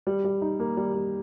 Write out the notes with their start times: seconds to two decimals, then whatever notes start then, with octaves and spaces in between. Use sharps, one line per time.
0.07 G3
0.24 G3
0.42 D#4
0.60 A#3
0.77 G3
0.94 G3